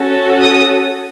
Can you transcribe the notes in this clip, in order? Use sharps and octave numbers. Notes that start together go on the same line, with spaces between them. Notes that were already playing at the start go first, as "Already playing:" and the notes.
Already playing: C#4 F#4 A4
D#6